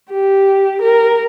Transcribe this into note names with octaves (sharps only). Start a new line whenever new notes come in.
G4
A#4